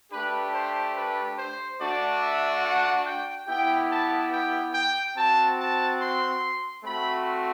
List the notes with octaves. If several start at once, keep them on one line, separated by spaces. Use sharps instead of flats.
A3 D4 G4 B4
C5
B4
C5
A3 D4 F#4 D5
E5
F#5
G5
B3 E4 G4 G5
A5
G5
G5
C4 F#4 A5
A5
C6
A3 C4 F#4 B5